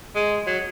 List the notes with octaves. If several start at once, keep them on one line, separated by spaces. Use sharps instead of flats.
G#3
F#3